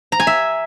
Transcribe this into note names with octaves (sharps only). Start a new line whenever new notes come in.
A#5
G#5
E5